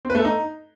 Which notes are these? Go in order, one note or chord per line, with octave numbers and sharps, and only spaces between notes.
C4
B4
A3
A4
D#4